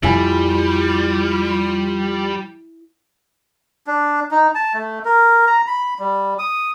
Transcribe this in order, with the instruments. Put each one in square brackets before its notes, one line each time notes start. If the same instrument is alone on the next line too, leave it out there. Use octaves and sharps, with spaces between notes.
[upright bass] F2 A#2 [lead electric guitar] G3 [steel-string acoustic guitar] E4 G#5 [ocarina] F4
[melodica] D4
D#4
A5
A3
A#4
A#5
B5
G3
D#6